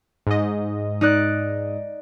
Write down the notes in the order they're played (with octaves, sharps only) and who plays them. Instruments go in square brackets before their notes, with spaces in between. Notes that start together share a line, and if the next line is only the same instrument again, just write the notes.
[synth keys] G#2 D#5
[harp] D#4 D5 F#6